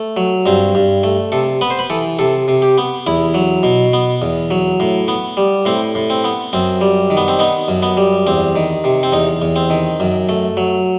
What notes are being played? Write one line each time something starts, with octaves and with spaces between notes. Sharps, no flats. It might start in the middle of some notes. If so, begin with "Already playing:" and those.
Already playing: A3
F#3
G2 C4
G2
A3
C3 A4
B3 B4
C5
B4
E3 A4
C3 A4
C3
G4
B3
E2 E4
F#3
B2
B3
E2
F#3
A2
B3
G3
A2 C4
A2
C4
B3
F#2 C4
G3
D#3
B3
C4
B3 D#4
F#2
B3
G3
E2 C4
D#3
C3
C4
E2 D#4
E2
C4
D#3
F#2
A3
F#3